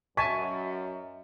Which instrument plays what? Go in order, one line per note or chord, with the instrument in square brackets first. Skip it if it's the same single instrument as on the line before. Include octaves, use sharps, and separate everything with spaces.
[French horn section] F#2 [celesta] D#5 E5 [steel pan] G#5 A5 [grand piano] C#6 B6